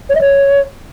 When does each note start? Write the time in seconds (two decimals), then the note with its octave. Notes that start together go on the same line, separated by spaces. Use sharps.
0.09 C#5
0.15 D#5
0.21 C#5